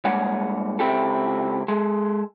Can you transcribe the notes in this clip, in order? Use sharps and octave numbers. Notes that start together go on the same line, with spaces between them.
G2 G#3 A#3 C#5 F#5 G#5
C#2 C4 E4 G4 A4
G#3 A4